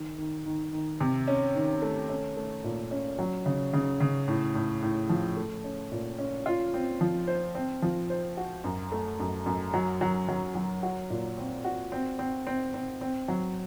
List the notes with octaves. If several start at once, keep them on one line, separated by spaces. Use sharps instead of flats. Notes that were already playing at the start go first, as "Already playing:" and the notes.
Already playing: D#3
D#3
D#3
D#3
C3
C#4
D#3
A3
C#4
A3
A#2
C#4
F#3
C#3
C#3
C#3
A2
A2
A2
F3
A3
C#4
A#2
C#4
F4
C4
F3
C5
C4
F3
C5
F#4
F#2
A3
F#2
F#2
F#3
F#3
F#3
F#3
F#4
A#2
C4
F#4
C4
C4
C4
C4
C4
F#3